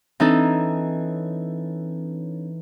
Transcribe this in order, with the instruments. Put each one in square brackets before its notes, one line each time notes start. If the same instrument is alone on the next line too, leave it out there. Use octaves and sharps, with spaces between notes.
[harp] E3 D#4 A4 [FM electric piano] C4 D4 C#5